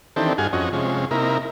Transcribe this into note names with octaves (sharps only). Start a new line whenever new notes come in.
D#3 E3 C4 D4 G4 A4
G2 F#4 G#4 F5 G#5
F2 C#4 F#4 D#5
C3 F3 G#3 C#4
C3 A#3 D#4 E4 A#4